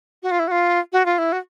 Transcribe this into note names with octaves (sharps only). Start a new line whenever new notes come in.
F#4
F4
E4
F#4
F4
F#4
F4
E4
F#4